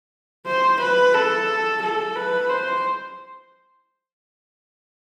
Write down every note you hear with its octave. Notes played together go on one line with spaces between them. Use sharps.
C5
B4
A4
A4
B4
C5